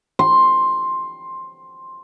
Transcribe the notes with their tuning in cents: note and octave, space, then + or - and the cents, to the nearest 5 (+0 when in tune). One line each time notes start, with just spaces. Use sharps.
C6 +10